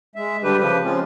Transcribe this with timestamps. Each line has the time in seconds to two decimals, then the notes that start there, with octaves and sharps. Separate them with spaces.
0.16 G#3 E5
0.44 D3 G3 D4 G4 B4
0.58 C#3 F3 G4 B4
0.83 F3 G#3 C4 C#4 F4